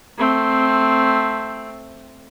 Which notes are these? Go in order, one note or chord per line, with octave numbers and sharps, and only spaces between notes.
A3 C4